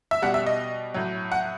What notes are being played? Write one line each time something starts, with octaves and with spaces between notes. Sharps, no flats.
E5
B2 G3 F#5
E5
D#5
A2 F#3
F#5